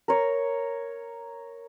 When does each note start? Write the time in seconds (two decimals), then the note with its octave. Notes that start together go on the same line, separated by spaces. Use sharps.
0.08 A#4 C#5